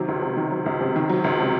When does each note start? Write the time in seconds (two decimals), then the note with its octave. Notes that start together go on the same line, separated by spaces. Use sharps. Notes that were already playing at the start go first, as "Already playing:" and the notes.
Already playing: C3 D#3 F#3
0.08 C#2
0.22 C3
0.37 D#3
0.52 F#3
0.66 C#2
0.81 C3
0.96 D#3
1.09 F#3
1.24 C#2
1.40 C3